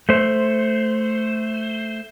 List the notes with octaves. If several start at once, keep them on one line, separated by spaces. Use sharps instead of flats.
A3 C5